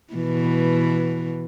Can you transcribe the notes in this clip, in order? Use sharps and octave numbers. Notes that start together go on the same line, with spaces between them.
B2 E3